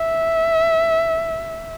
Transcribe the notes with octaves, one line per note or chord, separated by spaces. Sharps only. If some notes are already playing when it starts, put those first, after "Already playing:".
Already playing: E5